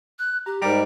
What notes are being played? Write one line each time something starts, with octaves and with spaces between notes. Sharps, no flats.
F#6
G4 A#5
G#2 G3 A#4 D5 A#5